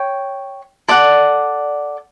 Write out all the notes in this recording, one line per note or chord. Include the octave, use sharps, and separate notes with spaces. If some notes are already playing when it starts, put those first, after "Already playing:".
Already playing: C#5 G5
A4 D5 F#5